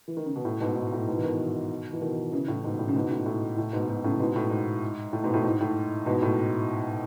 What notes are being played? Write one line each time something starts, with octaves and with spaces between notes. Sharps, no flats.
E3
D#3
C#3
B2
A2
G#2 B2
G#2
A2
G#2 B2
E3
B2 D#3
E3
B2 D#3
C#3 E3
A2 C#3
G#2 B2
A2
C#3
G#2 B2
A2
A2
A2
G#2 B2
G#2 B2
A2 C#3
G#2 B2
B2
A2
G#2
A2
G#2 B2
A2
G#2
A2
G#2 B2
A2